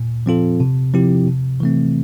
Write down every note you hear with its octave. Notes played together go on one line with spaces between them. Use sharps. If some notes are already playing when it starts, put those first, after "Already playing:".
Already playing: A#2
F3 C4 F4 A4
C3
F3 C4 E4 G4
C3
E3 A3 C4